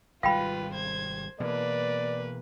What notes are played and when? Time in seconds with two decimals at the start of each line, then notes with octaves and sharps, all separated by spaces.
0.23 G#1 C3 G3 F4 B4 F5 G5 B5
0.73 C5 G#6
1.40 B2 E3 A#3 B4 D5